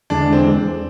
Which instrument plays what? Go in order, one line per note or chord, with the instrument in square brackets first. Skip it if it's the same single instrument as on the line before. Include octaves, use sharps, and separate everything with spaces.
[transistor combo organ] E2 D3 G#3 [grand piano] D4
[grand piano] C4